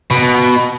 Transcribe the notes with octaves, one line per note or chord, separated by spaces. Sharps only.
B2